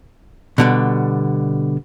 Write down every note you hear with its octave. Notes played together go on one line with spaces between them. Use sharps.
B2 D3 G3